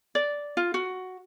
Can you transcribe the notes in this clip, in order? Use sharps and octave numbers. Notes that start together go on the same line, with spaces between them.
D5
F4
F#4